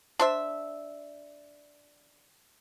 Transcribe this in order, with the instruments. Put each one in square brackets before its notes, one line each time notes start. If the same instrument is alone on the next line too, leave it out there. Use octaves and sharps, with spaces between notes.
[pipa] D4 C5 E5